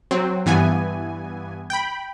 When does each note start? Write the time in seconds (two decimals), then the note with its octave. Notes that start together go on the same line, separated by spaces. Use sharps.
0.11 F#3 C4
0.46 G2 E3 B3 G#5
1.70 G5 B5